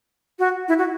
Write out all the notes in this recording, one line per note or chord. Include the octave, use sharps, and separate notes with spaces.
F#4
E4
F#4